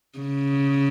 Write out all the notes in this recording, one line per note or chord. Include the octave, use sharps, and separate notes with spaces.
C#3